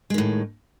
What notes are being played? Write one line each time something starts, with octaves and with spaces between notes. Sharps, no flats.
A2 D#3 G#3